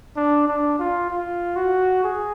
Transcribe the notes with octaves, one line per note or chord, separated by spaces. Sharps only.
D4
D4
F4
F4
F#4
G#4